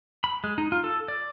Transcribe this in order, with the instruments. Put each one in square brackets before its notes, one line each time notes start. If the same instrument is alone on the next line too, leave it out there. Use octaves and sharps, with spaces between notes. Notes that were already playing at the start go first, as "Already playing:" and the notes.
[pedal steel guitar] B5
G#3
D#4
F4
A4
D5